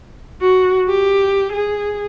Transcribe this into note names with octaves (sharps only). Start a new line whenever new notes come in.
F#4
G4
G#4